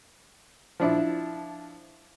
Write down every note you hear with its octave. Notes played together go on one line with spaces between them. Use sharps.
F3 D4 E4